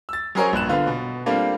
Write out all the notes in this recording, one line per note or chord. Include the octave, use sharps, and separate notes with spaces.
E6 A6
F#3 C#4 G#4 A#4 C5 C#5
A#1 G2 F#6 E7
D3 B3 F4
B2
G3 A3 A#3 C4 D4 F4